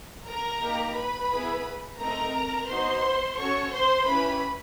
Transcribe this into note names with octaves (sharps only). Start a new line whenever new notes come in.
A#4 A#5
A#3 D#4 G4
B4 B5
B3 E4 G#4
A3 C4 D#4 A#4 A#5
B3 D#4 F#4 C5 C6
C#4 F#4 A4 C#5 C#6
C5 C6
C#4 E4 G4 B4 B5